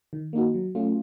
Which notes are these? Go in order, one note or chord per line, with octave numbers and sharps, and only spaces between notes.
D#3
A#3 D#4 F#4
F#3
A3 C#4 F4